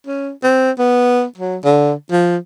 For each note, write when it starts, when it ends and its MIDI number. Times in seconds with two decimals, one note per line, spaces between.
0.07 0.31 61
0.43 0.71 60
0.79 1.25 59
1.37 1.57 54
1.64 1.93 50
2.11 2.37 53